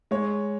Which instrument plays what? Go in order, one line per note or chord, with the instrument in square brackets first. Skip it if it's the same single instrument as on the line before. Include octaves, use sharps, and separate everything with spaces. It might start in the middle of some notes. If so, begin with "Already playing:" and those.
[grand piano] G#3 C#5